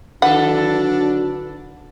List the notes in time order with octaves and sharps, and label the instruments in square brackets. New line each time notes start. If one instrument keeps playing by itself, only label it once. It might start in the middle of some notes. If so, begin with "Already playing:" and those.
[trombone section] D3 F#3 F#4 [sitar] D#3 A4 B4 [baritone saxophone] D4 [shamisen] F#5